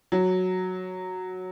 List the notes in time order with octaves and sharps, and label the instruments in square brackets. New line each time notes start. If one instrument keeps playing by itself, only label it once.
[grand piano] F#3